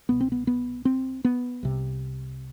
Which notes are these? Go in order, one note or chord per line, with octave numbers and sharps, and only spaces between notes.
C2 B2 B3
C4
B3
B3
C4
B3
C2 C3